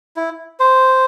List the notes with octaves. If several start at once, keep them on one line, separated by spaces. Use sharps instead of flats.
E4
C5